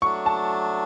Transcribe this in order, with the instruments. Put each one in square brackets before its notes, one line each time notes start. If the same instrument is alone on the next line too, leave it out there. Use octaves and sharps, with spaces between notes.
[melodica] F#3 A3 D4 [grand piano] C#6
[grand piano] A5